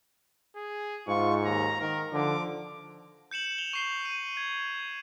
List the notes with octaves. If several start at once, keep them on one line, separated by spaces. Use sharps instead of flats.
G#4
G#2 F4 C#6
D#2 A#5
D#3 A#4
D3 F3 D6
G6 C#7 E7 F#7
F7 G7
C#6 C7 G7
D#7
G#6